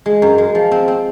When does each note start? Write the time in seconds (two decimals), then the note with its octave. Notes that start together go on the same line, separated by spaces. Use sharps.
0.06 G#3
0.22 F#2
0.38 G#3
0.55 F3
0.71 C4
0.88 C4